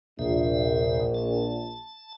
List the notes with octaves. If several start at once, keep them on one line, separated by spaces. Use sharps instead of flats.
A#1 D#2 C3 E5
A5